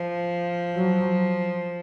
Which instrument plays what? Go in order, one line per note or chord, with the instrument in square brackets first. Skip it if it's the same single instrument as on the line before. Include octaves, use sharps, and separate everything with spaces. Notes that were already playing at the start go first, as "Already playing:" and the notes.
Already playing: [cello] F3
[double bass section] F#3